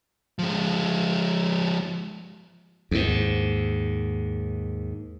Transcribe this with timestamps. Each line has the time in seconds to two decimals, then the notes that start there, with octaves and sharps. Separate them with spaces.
0.39 F3 G#3
2.91 D#2 G#2